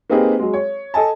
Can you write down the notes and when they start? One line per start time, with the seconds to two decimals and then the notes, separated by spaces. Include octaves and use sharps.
0.10 A#3 C4 D#4 G4 G#4 B4
0.39 F#3 G#3
0.53 C#5
0.94 A4 D#5 G#5 A5